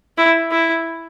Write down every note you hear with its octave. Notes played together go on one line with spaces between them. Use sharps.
E4
E4